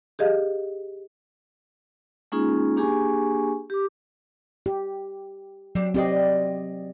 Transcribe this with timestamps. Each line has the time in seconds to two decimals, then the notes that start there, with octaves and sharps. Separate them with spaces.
0.19 G4 G#4 D#5 F5
2.32 G#3 A#3 C#4 D#4 F4 G#4
2.76 A#3 D4 G4 G#4 G#5 C#6
3.70 G4 D6
4.66 G4
5.75 F#3 C4 D4 G4
5.94 C4 G4 G#4 D5 D#5 G5